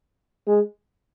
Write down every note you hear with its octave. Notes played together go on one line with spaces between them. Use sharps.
G#3